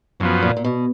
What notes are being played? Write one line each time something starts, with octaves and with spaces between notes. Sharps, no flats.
F#2 B2 F3 B3
A#2
A#2
B2